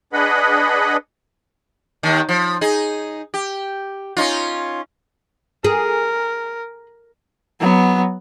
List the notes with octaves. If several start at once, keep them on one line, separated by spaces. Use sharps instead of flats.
D4 G#4 B4 D#5 F#5 B5
D#2 D#3
F3
D#4 G#4
G4
C#4 D#4 F4
G#4 A#4
F#3 B3